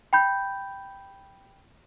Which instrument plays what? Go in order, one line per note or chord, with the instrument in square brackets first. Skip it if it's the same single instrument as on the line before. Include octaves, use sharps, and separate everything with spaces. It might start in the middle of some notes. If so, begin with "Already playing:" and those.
[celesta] G5 B5 G6